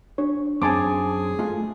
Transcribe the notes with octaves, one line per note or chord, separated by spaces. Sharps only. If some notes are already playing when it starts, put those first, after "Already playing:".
D4 C#5
F#2 C4 G#4 G#5 A5 C6 D6
G#3 A3 F4